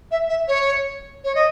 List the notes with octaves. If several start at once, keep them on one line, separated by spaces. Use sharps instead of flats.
E5
E5
C#5
C#5
D#5